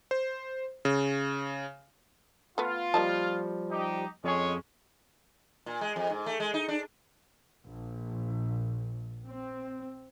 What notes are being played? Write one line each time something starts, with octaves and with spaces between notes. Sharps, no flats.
C5
C#3
A3 B3 F4
F3 G3 A#3 D#5 A5
D#4 G4
F2 G#3 C#4 G#4 C#5
A#2
G#3
F2
G#2
A3
G#3
D#4
D4
A#1
C4